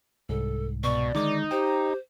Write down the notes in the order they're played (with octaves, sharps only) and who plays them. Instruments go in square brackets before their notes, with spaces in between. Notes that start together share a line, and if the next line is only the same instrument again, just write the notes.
[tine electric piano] C2 G#2 [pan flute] A4
[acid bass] B2 [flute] D5 [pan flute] C#6
[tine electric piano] D3 D#3 G#3 [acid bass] D#4 [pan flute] D6
[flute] G4 [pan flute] C5 [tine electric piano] G5